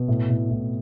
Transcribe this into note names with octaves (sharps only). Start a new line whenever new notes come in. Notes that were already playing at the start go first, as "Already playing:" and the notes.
Already playing: B2
A2
A2
A2